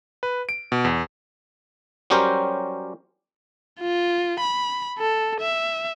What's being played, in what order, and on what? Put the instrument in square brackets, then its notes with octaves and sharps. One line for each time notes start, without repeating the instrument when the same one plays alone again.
[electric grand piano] B4
D7
B2
E2
[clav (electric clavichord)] F#3 G3 C#4 G4 A#4 C5
[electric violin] F4
B5
A4
E5